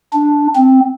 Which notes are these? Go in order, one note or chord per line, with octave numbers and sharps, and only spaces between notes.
D4
C4